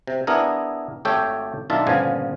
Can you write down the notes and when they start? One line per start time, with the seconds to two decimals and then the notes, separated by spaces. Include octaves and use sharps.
0.07 C3
0.27 B3 D4 E4 G#4 A#4
1.05 G#1 A3 G4 A4 C#5 G5
1.70 B1 D#3 D4 F4 E5 A5
1.87 G1 A#2 C#3 F3 B3 G#5